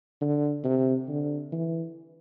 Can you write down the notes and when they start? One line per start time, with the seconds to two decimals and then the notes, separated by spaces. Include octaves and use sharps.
0.22 D3
0.64 C3
1.09 D3
1.52 E3